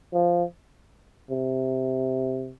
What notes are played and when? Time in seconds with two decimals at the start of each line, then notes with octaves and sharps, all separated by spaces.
0.13 F3
1.30 C3